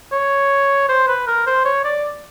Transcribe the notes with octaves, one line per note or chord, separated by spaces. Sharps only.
C#5
C5
B4
A#4
C5
C#5
D5